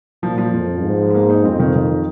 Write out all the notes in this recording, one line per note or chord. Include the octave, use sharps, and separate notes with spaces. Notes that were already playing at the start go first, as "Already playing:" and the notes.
A#2 F3
F3
F2
G#2
G#3
A#3
D#4
F2 C4
D#3
D#3